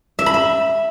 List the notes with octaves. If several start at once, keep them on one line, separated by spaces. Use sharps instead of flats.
E5
B5
E5